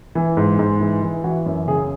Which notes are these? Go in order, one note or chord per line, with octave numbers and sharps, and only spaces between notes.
E3
G#2
G#2
E3
E3
E3 F#4
F#2
C#3 G#4